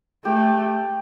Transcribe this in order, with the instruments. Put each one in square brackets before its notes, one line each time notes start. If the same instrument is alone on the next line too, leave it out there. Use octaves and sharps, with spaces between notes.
[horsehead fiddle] A3 [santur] G4